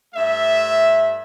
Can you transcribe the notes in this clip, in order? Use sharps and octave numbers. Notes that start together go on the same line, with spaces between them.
G2 A3 E5